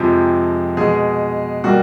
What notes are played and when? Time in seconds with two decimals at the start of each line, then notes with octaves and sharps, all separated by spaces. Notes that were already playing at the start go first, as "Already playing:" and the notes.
Already playing: F2 C3 F3 G#3
0.77 B2 G#3 G#4
1.64 B2 G3 A#3 F#4